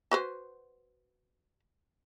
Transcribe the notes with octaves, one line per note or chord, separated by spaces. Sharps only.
F#4 B4 C5